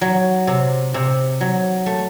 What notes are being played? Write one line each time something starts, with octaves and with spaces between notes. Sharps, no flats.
F#3
C3
C3
F#3
A3